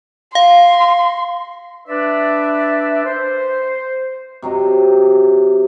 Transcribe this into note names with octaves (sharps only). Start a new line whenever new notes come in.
F5 C6
D4 B4 D5 E5
C5
C3 F#3 D#4 D#5